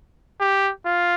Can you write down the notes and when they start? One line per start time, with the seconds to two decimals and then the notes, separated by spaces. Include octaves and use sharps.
0.40 G4
0.85 F4